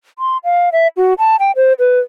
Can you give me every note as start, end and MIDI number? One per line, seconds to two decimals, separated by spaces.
0.19 0.37 84
0.44 0.69 77
0.73 0.88 76
0.97 1.14 66
1.18 1.36 81
1.40 1.52 79
1.56 1.73 72
1.79 1.99 71